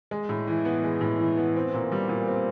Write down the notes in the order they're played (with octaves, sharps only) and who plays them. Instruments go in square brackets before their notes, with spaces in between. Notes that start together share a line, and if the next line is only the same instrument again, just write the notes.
[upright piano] G#3
A2
E3
B3
G#3
A2
E3
B3
C4
A#2
G3
A#2
C4